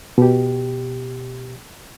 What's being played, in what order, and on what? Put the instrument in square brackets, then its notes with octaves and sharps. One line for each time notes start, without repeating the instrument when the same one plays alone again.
[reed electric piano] B2 G4